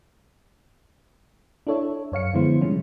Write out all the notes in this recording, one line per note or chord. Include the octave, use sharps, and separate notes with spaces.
D4 E4 A4 C#5 E5
F#2 C#5 F5 C#7
D3 F3 G#3 B3 E4 C5
C3 F3 G3 G#3 C#4